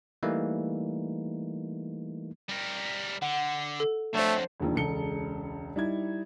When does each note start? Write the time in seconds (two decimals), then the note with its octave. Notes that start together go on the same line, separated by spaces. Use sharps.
0.23 E3 G3 A3 A#3 D#4
2.49 G3 A#4
3.22 D3 F#5
3.80 A4
4.14 F2 F#3 A3 D4 C5
4.60 E1 A#1 D#2 F3
4.75 E1 C#2 A4 C#7 G7
5.76 G3 D#4 E4 G#6